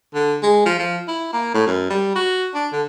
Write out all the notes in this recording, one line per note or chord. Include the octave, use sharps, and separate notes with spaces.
D3
G#3
F3
F3
E4
A#3
A2
F#2
G3
F#4
D4
D3